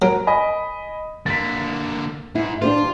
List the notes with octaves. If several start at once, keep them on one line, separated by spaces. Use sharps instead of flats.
F#3 A#4 D7
D#5 G#5 B5
D3 A#3 A6 B6
G#2 E4
D4 F4 G4 C5